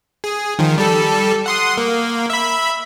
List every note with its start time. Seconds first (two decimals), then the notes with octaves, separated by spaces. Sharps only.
0.24 G#4
0.59 D#3 F3
0.78 G3 A4
1.46 F#5 C6 D#6
1.77 A#3
2.30 E5 B5